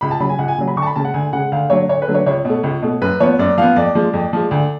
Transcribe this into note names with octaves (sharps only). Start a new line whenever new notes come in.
C#2 B5
A5
C#3 F#3 B5
G#5
C#2 F#5
G#5
C#3 F#3
B5
D2 C#6
A5
B5
C#3 G#3 A5
F#5
D2 G#5
C#3 G#3 F#5
D2 F5
D3 F#3 A3 C#5
D2 C#5
B4
D3 F#3 A3
C#5
C#2 C#5
B2
A3
C#2
B2 A3
F#2 B4
F3 B3 C#5
F#2 D5
F3 B3 F5
F2 D5
F3 G#3
F2
F3 G#3
D2